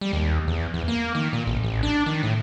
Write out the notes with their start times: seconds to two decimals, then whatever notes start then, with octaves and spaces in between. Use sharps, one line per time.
0.01 G3
0.13 D#2
0.47 E2
0.74 E2
0.88 A#3
1.15 D#3
1.33 A#2
1.47 A1
1.63 A1
1.83 D4
2.06 D#3
2.23 A2